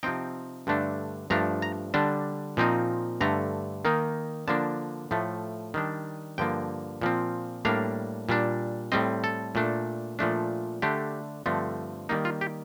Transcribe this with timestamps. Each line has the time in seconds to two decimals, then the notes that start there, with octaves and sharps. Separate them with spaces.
0.03 C3 F3 C4 D#4 G5
0.67 G2 D3 A3 D4
1.30 G2 F3 A3 D4 A#5
1.62 A#5
1.94 D3 G3 D4 A5
2.57 A#2 F3 C4 D#4
3.21 G2 D3 A3 A#5
3.85 D#3 A#3 D#4
4.48 D3 F3 A#3 D4 A5
5.11 A2 F3 A3
5.74 D#3 G3 D4
6.38 G2 D3 F3 A#3 G5
7.01 A#2 F3 C4
7.65 A2 G3 A#3 D4 F5
8.29 A#2 G3 D4
8.92 A2 G3 C4 D#5
9.24 A4
9.55 A#2 A3 D4
10.19 A#2 F3 A3 D4
10.82 D3 A3 D4 G4
11.46 G2 D3 F3 A3 C4
12.09 D#3 G3 A#3 D#4
12.25 F4
12.41 G4